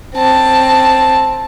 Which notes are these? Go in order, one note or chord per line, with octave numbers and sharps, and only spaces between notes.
C4 A5